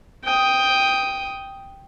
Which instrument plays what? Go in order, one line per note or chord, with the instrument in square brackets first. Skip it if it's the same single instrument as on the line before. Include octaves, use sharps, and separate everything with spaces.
[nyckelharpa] G5 D#6